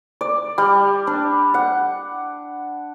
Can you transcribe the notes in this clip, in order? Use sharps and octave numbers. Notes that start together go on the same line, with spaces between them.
D5
G3
D4
F#5